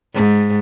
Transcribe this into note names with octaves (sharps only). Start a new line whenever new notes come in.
G#2